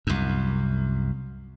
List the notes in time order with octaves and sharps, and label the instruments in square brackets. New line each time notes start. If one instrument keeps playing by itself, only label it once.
[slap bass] C2 F#2